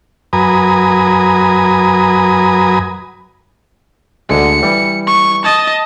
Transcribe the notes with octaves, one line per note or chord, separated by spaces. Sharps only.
F#2 B4 G#5 A#5 D#6
D2 D3 G#3 C#7
E3 G3
C#6
D#5 A5